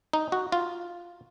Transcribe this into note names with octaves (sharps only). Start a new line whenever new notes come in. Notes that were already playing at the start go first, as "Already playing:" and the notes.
D#4
F#4
F4